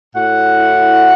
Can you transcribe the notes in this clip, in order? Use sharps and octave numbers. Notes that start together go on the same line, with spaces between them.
A2 F#4 F#5
E4